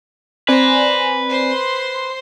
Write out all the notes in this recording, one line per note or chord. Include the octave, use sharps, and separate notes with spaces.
C4 B4 C5 D5 G#5 A#5
C5 C6